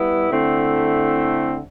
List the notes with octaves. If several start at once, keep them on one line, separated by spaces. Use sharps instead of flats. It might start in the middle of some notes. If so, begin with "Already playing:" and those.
Already playing: G3 B3 E4 B4
D3 A3 C4 E4